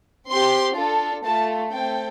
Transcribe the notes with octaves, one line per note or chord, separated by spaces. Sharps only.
C4 G4 C6
D4 F4 A4
A3 F4 A4 A5
A3 C4 A4 G5